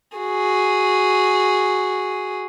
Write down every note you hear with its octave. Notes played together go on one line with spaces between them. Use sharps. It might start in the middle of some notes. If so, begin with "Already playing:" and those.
F#4 G#4